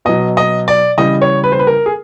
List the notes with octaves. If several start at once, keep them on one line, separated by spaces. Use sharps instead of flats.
B2 F#3 D#5
D#5
D5
C#3 E3 G3 D#5
C#5
B4
C5
B4
A#4
G#4